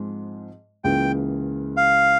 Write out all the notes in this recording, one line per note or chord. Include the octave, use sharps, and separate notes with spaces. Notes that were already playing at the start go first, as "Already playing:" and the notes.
Already playing: G#2 F3 G#3 C4
C#2 C#3 E3 A#3 G5
F5